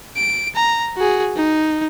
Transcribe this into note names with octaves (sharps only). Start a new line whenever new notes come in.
D7
A#5
F#4 G#4
D#4